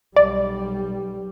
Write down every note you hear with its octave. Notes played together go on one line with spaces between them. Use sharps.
B1 G3 D5